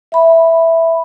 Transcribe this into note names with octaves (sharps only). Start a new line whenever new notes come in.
E5 B5